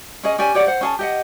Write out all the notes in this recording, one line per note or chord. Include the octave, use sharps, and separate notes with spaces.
C#4 G#4 D#5
C#4 G4 D5 G#5
G4 C#5 D5 F#5
C5 F#5
C#4 G#4 A5
G4 D#5 F#5